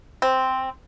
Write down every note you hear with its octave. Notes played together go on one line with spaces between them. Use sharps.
C4